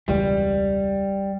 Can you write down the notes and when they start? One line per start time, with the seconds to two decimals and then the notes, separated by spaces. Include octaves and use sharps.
0.08 E1 C#2 G3